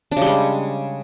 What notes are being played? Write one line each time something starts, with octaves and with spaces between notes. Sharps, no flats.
C#3 G3 G#3 D4